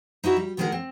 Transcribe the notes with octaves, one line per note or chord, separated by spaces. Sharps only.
D#4 E4 F#4 E5
G3
D2 D#3 G#3 G#4 A#4 F#5
C4